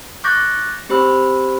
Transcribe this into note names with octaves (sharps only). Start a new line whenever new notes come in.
C#6 D6 F#6 G6 A6 A#6
C4 G4 C5 B5 E6